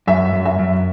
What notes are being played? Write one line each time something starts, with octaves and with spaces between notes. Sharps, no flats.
F#2 E5
F#2
E5
F#2